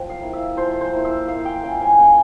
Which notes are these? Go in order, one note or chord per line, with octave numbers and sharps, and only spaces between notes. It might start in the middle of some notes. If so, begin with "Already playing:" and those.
Already playing: F3 G5
F5
A#3 E4
E5
F3 C5
C5
A#3 E4
E5
A#3 F5
G5
C#4 F4 G5
G#5
A#3 G5